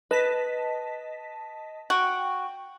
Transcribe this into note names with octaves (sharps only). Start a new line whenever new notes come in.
B4 D#5 A5 B6
F#4 G5